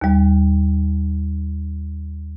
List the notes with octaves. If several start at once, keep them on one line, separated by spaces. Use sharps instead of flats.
D#2 G3